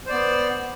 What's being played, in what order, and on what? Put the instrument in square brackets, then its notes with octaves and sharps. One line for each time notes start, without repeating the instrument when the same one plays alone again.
[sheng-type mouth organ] C5
D5
B3